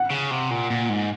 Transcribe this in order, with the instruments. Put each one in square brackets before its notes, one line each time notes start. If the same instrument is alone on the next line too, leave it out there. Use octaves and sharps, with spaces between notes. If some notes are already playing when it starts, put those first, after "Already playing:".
Already playing: [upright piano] F#5
[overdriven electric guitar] C#3
C3
A#2
A#2
G#2